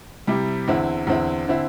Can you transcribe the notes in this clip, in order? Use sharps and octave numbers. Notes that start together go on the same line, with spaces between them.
C3 G3 E4
E2 D3 C4 E4
E2 D3 C4 E4
D3 C4 E4